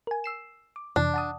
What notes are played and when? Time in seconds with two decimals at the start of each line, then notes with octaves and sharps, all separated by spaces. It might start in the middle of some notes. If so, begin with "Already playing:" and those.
0.07 A#4 G#5
0.24 E6 C7 E7
0.76 D6
0.96 F2 C3 E3 D4
1.14 F#5 A5 D#6